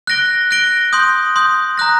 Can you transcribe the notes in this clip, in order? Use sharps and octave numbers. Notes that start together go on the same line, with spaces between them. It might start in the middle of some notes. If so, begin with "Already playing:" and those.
F#6 A#6 D7 G7
F#6 A#6 D7 G7
C6 D#6 G6
C6 D#6 G6
A#5 D#6 F#6 A#6